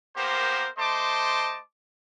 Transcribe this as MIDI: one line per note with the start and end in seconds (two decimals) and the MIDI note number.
0.16 0.67 58
0.16 0.67 59
0.16 0.67 67
0.16 0.67 70
0.16 0.67 72
0.78 1.60 57
0.78 1.60 72
0.78 1.60 75
0.78 1.60 81
0.78 1.60 84
0.78 1.60 86